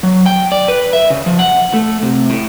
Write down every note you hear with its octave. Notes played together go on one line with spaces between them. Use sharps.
F#3
G5
D5
B4
E5
C#3
F3
F#5
A3
C3
A2